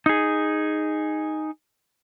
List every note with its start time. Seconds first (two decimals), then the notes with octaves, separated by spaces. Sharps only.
0.06 D#4 G#4